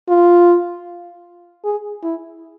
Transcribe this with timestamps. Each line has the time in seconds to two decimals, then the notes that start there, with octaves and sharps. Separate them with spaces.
0.09 F4
1.64 G#4
2.03 E4